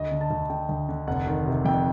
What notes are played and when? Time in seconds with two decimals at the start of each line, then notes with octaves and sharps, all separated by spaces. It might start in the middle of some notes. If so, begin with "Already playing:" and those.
Already playing: D2 D#5
0.11 D3
0.21 A5
0.31 D2
0.50 D3 G5
0.69 D2
0.89 D3
1.07 F1 F#5
1.27 D#3
1.46 C3
1.64 F2 G5